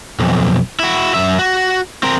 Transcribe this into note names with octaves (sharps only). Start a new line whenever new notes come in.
B1 F2
E4 F#4
F#2 E5
F#4
C4 A#4